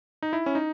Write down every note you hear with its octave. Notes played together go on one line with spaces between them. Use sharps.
D#4
E4
C#4
D#4